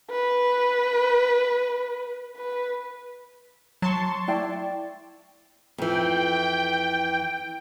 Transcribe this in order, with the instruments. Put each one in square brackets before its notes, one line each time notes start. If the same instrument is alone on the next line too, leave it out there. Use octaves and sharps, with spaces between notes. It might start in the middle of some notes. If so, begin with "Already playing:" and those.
[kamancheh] B4
B4
[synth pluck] F#3 [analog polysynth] A5 C6 C#6
[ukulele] E4 G5 [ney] D5
[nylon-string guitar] F2 E3 [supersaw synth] G5